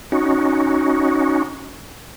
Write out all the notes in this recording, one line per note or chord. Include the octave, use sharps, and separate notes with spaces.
C#4 D#4 F#4